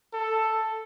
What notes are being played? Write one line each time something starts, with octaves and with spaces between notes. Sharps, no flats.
A4